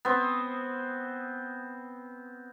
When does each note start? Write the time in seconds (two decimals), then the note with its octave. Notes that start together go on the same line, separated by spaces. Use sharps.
0.05 B3 C4